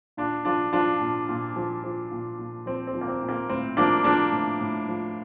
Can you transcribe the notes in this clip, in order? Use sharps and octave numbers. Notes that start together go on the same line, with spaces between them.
A#2 D4 F4
F3 D4 F4
F3 D4 F4
A#2
A#2
F3
F3
A#2
A#2
F3 C4
C4
F3
A#3
C4
A#2
A#3
A2 C4
F3 A#3 D4
F3 A#3 D4
A2
A2
F3